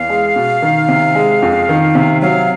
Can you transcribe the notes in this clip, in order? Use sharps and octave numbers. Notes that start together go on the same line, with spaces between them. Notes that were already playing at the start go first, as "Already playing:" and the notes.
Already playing: E2 F5
G#3
B2
D#3
C3
G#3
F2
D#3
C3
F#3 F5